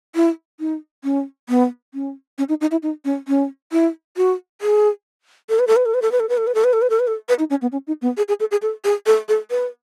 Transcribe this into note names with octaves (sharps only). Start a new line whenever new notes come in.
E4
D#4
C#4
B3
C#4
C#4
D#4
D#4
E4
D#4
C#4
C#4
E4
F#4
G#4
A4
B4
A4
B4
A4
B4
A4
B4
A4
B4
A4
B4
A4
B4
A4
B4
A4
B4
A4
B4
D#4
C#4
B3
C#4
D#4
B3
G#4
G#4
A4
G#4
A4
G#4
A4
A4
B4